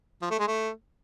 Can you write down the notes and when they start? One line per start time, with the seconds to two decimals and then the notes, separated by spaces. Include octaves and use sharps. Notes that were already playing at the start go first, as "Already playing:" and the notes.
0.22 F3
0.31 A3
0.39 G#3
0.48 A3